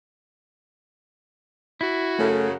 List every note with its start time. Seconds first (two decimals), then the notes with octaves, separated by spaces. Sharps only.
1.81 E4 F#4
2.19 F#2 C#3 A3 A4